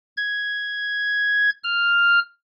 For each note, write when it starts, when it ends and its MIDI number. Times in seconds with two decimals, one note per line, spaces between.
0.17 1.50 92
1.64 2.19 89